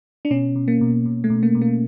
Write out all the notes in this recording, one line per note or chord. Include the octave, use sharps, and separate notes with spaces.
D4
B2 C#4
B2
A#3
B2
B2
A3
B2
A#3
B2
A#3